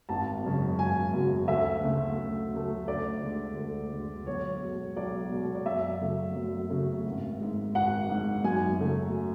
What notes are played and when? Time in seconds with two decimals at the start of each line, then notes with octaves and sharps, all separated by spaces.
0.09 G#1 A5
0.44 F#2 C#3 F#3
0.79 G#1 G#5
1.13 F#2 C#3 F#3
1.48 D2 E5
1.83 C#3 F#3 A3
2.18 D2
2.53 C#3 F#3 A3
2.87 D2 D5
3.22 D3 G#3
3.57 D2
3.92 D3 G#3
4.26 B1 C#5
4.62 B2 G#3
4.96 B1 D5
5.31 B2 G#3
5.55 D5
5.66 F#2 E5
6.01 C#3 F#3 A3
6.36 F#2
6.70 C#3 F#3 A3
7.05 G#1
7.41 G#2 G#3
7.75 G#1 F#5
8.10 G#2 G#3
8.44 F#2 G#5
8.79 C#3 F#3 A3